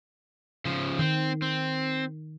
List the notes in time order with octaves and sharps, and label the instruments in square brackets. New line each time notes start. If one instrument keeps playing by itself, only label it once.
[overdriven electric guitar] C#3 F3
[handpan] D#3 [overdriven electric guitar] C4
[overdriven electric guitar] C4